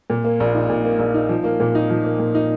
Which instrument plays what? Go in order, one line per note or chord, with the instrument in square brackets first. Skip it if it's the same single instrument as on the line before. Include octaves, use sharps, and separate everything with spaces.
[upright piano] A#2
A#3
A#1
D#4
A#2
A#3
A#1
D#4
F3
A#3
A#2
D#4
F3
A#3
A#2
D#4